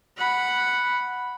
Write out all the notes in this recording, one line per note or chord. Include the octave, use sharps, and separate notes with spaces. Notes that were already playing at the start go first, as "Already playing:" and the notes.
F#5 B5